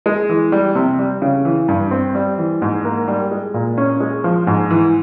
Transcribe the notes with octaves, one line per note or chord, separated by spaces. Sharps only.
G#3
E3
G3
C3
G3
C#3
E3
G2
C4
G3
E3
G#2
A#3
G3
G#3
A#2
C#4
G#3
F3
G#2
E3